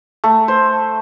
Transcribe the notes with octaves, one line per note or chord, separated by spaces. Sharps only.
A3
C5